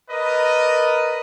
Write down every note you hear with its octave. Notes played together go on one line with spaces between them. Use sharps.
A#4 B4 D5 D#5